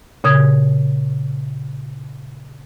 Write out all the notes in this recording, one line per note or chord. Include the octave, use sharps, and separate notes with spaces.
A#2 C#3 D#6 G#6